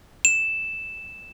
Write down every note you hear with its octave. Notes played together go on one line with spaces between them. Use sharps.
E7